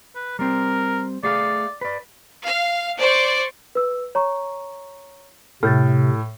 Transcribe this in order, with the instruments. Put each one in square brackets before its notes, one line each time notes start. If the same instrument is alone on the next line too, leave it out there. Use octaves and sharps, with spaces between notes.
[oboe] B4
[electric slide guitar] G3 C4 [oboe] A#4
[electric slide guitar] A3 G#4 F5 [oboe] D5
[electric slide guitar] B4 D5
[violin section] F5
C5 D5 C#6
[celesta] B4 E6
C#5 A#5 C#6
[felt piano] A2 [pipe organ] C3 [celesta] F6 G6 A6